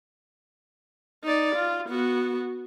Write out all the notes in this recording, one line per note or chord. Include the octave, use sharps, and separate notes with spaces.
D#4 D5
F4
B3 F#4